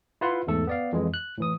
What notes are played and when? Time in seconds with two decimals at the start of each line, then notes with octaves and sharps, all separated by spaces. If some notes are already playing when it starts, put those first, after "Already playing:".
0.21 E4 F4 B4 F#5 C6
0.47 E2 G#2 A3 A4
0.67 B3 D5 F5
0.92 F2 E3 G#3
1.14 F#6
1.38 A2 E3 D#6